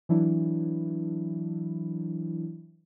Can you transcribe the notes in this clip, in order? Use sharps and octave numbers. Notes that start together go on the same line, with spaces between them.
E3 F#3 D4 E4